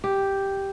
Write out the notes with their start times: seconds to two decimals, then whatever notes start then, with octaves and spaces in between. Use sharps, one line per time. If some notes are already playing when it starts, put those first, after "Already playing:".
0.04 G4